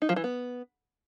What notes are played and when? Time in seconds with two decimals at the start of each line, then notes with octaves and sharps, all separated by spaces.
0.02 D#4
0.09 F3
0.16 E3
0.24 B3